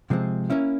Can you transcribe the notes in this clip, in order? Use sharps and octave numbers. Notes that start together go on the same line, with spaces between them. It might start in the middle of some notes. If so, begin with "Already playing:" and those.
C3 F3 G#3 C4
A#3 C#4 E4